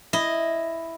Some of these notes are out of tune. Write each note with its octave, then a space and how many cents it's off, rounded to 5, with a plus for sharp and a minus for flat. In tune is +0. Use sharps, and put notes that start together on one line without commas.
E4 +0 D#5 +0